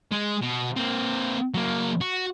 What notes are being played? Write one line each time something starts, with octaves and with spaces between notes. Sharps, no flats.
G#3
B2
A#3 C4
F#3 A#3
F#4